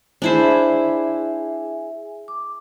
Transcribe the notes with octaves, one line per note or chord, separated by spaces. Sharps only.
D4 E4 G#4 C5 E5 G#5
D6